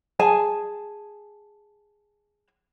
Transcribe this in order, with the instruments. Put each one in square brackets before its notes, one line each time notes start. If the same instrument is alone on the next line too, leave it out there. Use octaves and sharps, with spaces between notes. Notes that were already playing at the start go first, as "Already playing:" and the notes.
[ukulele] G#4 G#5 A5